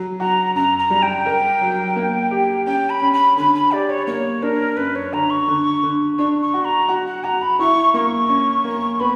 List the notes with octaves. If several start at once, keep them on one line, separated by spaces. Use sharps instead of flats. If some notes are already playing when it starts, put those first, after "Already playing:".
Already playing: F#3
F#4 A#5
F#2 A#5
A#5
G3
G5
A#4
F#3
A#3
G4
C#4 G5
B5
C#4
B5
D3 B5
B5
G4 D5
C#5
A#3 C#5
D4 A#4
F#2 B4
C#5
D3 A#5
C#6
D3
D3
D4 C#6
C#6
F#4
A#5
F#4
F#5
F#4 A#5
B5
E4 C#6
A#3 C#6
C#4
A#3
B3 B5